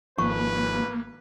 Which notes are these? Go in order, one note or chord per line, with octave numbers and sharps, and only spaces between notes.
G#1 F3 A#3 B4 C#6